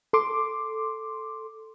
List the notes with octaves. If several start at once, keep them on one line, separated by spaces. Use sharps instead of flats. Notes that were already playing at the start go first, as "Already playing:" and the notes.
A4 C6 D6